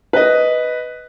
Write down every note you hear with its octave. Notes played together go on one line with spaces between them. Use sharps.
B4 D#5